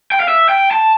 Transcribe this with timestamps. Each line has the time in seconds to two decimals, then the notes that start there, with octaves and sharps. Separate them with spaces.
0.12 G5
0.20 F5
0.28 E5
0.49 G5
0.71 A5